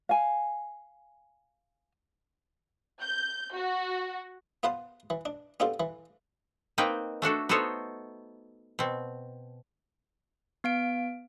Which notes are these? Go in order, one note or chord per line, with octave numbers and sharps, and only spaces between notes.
F5 G#5
G6
F#4
B3 F4 B4 C5 A5
E3
D4
B3 C4 D4 F4 G4 A4
E3
A#3 C4 D#4 B4 G5
A3 D4 F#4 A4
B3 D#4 F#4 A4 C5 C#5
B2 C4
B3 F5 D7